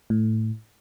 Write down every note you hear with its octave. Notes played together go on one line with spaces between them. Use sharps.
A2